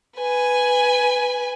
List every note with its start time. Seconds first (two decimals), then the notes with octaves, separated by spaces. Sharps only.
0.19 B4 G#5